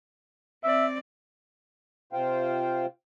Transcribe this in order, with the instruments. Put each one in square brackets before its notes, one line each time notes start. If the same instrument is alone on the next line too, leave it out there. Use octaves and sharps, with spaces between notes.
[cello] C4 D5 [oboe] E5
[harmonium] C3 F4 C5 F5 G5